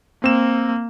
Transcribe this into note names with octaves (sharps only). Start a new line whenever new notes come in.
A#3 C4 E7